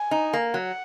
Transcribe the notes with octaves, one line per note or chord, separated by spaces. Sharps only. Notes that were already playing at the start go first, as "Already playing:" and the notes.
Already playing: G#5
D#4
A#3
F#3 F#5